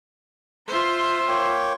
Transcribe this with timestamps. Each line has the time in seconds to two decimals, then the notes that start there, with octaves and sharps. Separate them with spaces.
0.67 F4 C5 E5 C6
1.28 A#3 C#5 G5